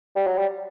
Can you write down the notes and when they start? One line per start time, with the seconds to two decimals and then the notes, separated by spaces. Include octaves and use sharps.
0.16 G3
0.26 F#3
0.38 G3